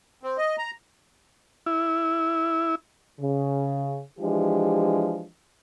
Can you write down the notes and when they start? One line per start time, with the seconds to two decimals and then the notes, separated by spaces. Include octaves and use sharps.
0.23 C4
0.38 D#5
0.58 A#5
1.66 E4
3.20 C#3
4.20 E3 F3 G#3 D4 G4